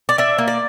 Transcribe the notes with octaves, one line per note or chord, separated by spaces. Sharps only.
D5
D4 E5
A#3
D5